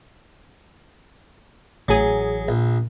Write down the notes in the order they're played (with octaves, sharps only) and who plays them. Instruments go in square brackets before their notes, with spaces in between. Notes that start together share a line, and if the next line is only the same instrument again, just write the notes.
[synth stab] A1 G#4 [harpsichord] F#3
[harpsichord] A#1